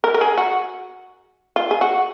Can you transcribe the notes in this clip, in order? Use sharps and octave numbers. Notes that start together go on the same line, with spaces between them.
A#4
A#4
G#4
F#4
F4
G#4
F#4